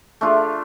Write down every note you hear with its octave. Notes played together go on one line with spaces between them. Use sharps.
A3 D4 F4